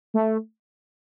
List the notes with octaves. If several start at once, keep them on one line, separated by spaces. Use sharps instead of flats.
A3